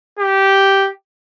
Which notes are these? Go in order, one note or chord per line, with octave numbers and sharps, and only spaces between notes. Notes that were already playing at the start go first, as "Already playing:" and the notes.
G4